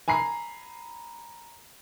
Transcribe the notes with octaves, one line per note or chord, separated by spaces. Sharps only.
G#5 A#5 B5 C7